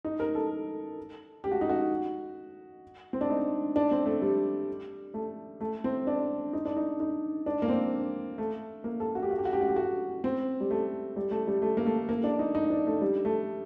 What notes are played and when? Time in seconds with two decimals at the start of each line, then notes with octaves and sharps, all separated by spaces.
0.05 D#4
0.20 A#4
0.35 A4
1.44 G4
1.52 F#4
1.61 D#4
1.69 F#4
3.13 C4
3.21 D4
3.30 D#4
3.76 D4
3.91 C4
4.06 A3
4.22 G3
5.14 A3
5.61 A3
5.84 C4
6.07 D4
6.53 D#4
6.65 D4
6.77 D#4
7.00 D#4
7.46 D4
7.62 A#3
7.68 C4
8.38 A3
8.84 A#3
9.00 A4
9.15 F#4
9.23 G4
9.31 F#4
9.38 G4
9.45 F#4
9.53 G4
9.61 F#4
9.68 G4
9.76 F#4
10.24 C4
10.61 G3
10.71 A3
11.16 G3
11.31 A3
11.47 G3
11.62 A3
11.77 A#3
11.86 A3
12.09 A#3
12.24 D4
12.39 D#4
12.55 D#4
12.70 D4
12.87 A3
13.01 G3
13.25 A3